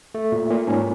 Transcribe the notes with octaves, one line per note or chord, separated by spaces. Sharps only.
A3
A#2
A#2
G#2 C#4